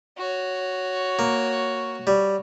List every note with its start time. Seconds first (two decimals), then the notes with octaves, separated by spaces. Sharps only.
0.18 F#4 C#5
1.19 A#3
2.07 G3